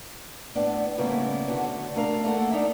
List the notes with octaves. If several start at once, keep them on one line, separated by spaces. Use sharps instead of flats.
A2 B3 D4
A2 C#3 G3 A#3 B3 E4
D3 B3 F#4
A3 D4 A#4 F5
A3 A#3 A4 F#5
D4 D#4 A#4 E5